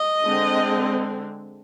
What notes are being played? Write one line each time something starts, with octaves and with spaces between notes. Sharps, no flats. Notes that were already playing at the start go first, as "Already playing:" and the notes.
Already playing: D#5
D3 G#3 C4